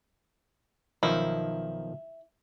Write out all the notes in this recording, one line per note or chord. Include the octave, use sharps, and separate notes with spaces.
B1 D#3 F3 E4